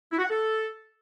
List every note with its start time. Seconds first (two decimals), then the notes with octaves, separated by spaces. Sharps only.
0.12 E4
0.18 F#4
0.24 F#5
0.30 A4